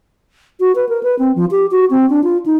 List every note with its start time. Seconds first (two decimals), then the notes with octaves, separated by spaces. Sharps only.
0.60 F#4
0.75 B4
0.89 A#4
1.03 B4
1.19 C4
1.36 F3
1.51 G4
1.71 F#4
1.91 C4
2.10 D4
2.24 F4
2.46 D#4